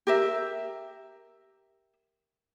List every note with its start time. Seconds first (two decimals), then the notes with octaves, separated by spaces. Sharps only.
0.07 G4 A#4 E5